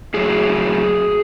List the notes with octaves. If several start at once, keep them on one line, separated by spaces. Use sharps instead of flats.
A2 F#3 G#4